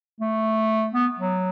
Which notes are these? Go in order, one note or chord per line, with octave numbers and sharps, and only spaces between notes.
A3
B3
F#3